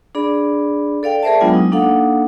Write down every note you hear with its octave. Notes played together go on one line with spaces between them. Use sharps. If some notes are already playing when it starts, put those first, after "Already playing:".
D4 G#4 D5 B5
A4 D5 F5 G5
G#4 A#4 C5 D5 E5 A5
F#3 G#3 B3 D4 F4 G5
D#4
A#3 D4 D#4 A4 F5 F#5